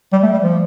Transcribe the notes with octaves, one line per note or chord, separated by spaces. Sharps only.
G3
A3
G3
F3